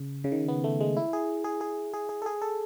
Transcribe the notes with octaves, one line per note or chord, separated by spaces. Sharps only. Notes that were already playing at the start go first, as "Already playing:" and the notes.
Already playing: C#3
C#3
D#3
B3
A3
G#3
E4
G#4
G#4
G#4
G#4
G#4
A4
G#4
A4